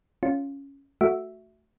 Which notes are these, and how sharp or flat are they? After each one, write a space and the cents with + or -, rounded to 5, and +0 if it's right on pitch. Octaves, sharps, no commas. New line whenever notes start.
C#4 +0 F4 +0
A3 +0 F#4 +0 E5 +0